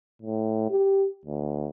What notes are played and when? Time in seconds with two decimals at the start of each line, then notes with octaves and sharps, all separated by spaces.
0.22 A2
0.70 G4
1.25 D2